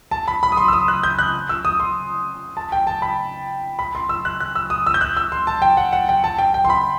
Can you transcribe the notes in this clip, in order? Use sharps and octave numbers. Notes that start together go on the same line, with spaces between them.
A5
B5
B5
D#6
C6
E6
D#6
F#6
G6
F#6
E6
D#6
C6
A5
G5
A5
B5
B5
C6
E6
F#6
F#6
E6
D#6
E6
G6
F#6
E6
C6
A5
G5
F#5
F#5
G5
A5
G5
G5
C6
B5